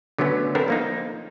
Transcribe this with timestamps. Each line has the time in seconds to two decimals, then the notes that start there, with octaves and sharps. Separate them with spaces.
0.18 D3 F#3 A3 B3 C#4
0.55 B3 C4 D4 A4 A#4
0.68 F3 A#3 D#4